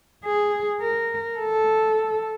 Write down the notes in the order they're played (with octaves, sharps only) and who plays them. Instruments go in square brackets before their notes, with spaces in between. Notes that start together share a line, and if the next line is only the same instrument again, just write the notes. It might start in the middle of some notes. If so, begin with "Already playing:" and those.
[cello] G#4
A#4
A4